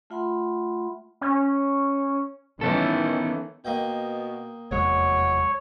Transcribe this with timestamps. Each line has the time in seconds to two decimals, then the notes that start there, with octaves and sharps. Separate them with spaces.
0.10 A3 F4 E5 F#5 B5 C6
1.21 C#4
2.61 D#3 E3 B3 C#4 A4
3.65 B2 A#3 D#5 G5
4.71 F1 E2 F#3 G#3 C#5